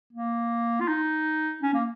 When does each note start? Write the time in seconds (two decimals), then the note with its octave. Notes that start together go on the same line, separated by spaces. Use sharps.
0.13 A#3
0.81 F4
0.88 D#4
1.63 C#4
1.74 A#3